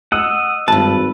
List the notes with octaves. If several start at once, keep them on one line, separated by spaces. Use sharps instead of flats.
D#5 F#5 E6
G#1 G2 B4 A5